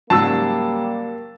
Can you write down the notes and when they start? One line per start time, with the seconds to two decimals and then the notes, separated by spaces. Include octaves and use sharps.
0.10 G#2 C#3 F#3 G3 A#3 A5 E6